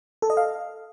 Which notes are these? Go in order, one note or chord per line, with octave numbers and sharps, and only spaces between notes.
A4
D#5
F5